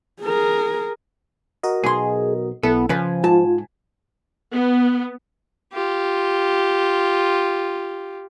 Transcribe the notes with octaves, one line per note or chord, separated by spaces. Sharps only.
G#4 A#4
F#4 A#4 D#5
B1 G#4 C6
B1 B3 E4 A4
C#3 F3 B4 G#5
G#2 F4 A5
B3
F4 G4